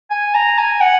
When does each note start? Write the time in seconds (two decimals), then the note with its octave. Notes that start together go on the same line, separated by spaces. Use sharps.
0.11 G#5
0.35 A#5
0.59 G#5
0.81 F#5